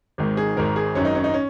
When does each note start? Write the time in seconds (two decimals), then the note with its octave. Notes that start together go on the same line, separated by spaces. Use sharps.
0.18 G#1 G#2 D#3
0.37 G#4
0.56 G#1 G#2 D#3 A#4
0.76 G#4
0.95 G#1 F#2 D#3 C#4
1.05 D#4
1.15 C#4
1.24 D#4
1.34 C#4